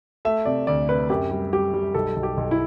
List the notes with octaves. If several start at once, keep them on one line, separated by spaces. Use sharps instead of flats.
A3 E5
C3 D5
D2 D5
C3 B4
F#2 G4
G3
G3 G4
G3
B1 A4
B1
G4
B1
E4